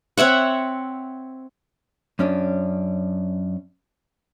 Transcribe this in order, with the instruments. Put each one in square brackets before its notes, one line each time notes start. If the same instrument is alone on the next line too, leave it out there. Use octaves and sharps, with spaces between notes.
[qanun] C4 C#5 E5 F#5
[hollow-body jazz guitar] F#2 C#4 D4